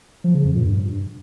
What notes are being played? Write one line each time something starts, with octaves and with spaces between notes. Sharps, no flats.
F3
C#3
F2
A#2
G2